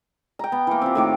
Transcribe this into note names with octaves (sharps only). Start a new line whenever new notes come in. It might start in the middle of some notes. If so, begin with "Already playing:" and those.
G5 A#5
B3
E3 A#3
C4 F4 G4
A2 D#3 D6